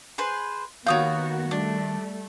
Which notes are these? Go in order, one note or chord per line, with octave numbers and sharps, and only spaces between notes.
G#4 B4 C5
D#3 A#3 B3 F#4 C#5 F5 D#6 G6
G3 A3 D4